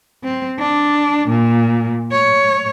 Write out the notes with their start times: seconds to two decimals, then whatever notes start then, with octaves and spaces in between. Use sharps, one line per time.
0.24 C4
0.59 D4
1.29 A#2
2.12 C#5